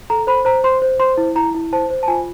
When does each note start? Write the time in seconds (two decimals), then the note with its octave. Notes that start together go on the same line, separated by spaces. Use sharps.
0.10 A4 A#5
0.27 C5 B5
0.45 C5 A#5
0.64 C5 C6
0.82 C5
1.00 C5 C6
1.17 E4
1.35 E4 A#5
1.55 E4
1.73 C5 A5
1.90 C5
2.03 A5
2.08 F4 G#5